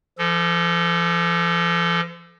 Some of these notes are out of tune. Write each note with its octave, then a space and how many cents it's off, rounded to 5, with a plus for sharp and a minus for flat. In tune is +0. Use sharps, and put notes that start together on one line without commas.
F3 -35 A4 +0